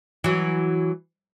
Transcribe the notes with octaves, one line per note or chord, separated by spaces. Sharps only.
E3 F#3